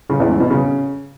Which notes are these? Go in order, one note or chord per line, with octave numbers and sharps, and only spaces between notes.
C#3
E2
G#2
B2
C#3